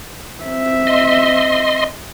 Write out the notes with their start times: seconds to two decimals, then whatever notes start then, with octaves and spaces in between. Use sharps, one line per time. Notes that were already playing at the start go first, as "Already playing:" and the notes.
0.43 C4 E5
0.87 D#5 C6